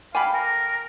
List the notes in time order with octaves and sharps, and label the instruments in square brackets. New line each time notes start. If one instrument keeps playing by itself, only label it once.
[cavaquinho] A4 G5 D6 [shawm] F5 [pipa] G#5 B5
[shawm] A#4